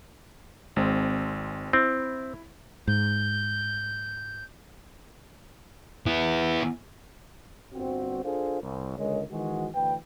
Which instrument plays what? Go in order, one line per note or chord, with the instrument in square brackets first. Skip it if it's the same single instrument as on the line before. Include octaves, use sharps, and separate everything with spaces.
[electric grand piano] G#1 G#3 C4
[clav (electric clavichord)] C4 [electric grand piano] E4
[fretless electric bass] G#2 [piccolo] G6
[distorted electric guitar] B3 E4
[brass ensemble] G1 C4 F#4
D4 F4 G#4 A4 C5 F5
C2
C#2 D3 G#3 A#4 C#5 D#5
D#3 E3 G#3 F#4
D2 E3 B4 G5